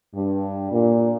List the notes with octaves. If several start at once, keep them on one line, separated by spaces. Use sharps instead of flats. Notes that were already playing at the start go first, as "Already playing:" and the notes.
G2
A#2